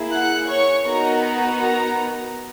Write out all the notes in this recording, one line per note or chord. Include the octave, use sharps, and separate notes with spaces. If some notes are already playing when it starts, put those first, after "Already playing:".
Already playing: A#3 E4 G#4
F#5 F#6
C#5 C#6
B3 D#4 F#4 A#4 A#5
A#4 A#5